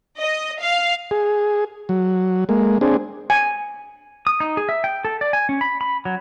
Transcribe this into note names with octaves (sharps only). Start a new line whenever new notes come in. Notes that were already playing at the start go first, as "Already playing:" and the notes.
D#5
F5
G#4
F#3
G#3 A#3
C4 D4 G#4
G#5
D#6
D#4
G#4
E5
G5
A4
D5
G#5
C#4
B5
B5
F#3